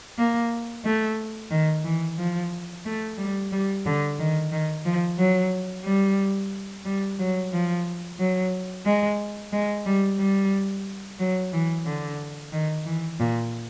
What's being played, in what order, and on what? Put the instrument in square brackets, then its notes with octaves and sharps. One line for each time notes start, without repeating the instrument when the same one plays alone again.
[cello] A#3
A3
D#3
E3
F3
A3
G3
G3
D3
D#3
D#3
F3
F#3
G3
G3
F#3
F3
F#3
G#3
G#3
G3
G3
F#3
E3
D3
D#3
E3
A#2